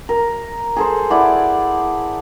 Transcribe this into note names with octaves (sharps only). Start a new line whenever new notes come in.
A#4
G#4 A4 C5
E4 D5 F#5